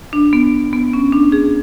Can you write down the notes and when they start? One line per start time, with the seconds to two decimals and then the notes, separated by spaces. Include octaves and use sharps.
0.13 D4
0.33 B3
0.73 B3
0.93 C#4
1.12 D4
1.32 G#4